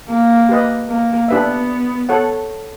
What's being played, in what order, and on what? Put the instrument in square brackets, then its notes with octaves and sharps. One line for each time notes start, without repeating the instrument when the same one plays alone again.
[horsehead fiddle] A#3
[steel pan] G4 B4 D#5
[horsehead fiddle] A#3
[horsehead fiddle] B3 [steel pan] D4 G4 B4 E5
[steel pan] A4 C#5 F#5